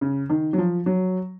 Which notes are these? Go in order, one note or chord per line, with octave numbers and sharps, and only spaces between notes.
C#3
D#3
F#3
F3
F#3